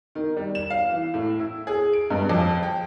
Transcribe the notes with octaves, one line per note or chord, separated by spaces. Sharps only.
D#3
G3
E7
F5
E3
A2
E4
G#4
D7
G2
F2
G5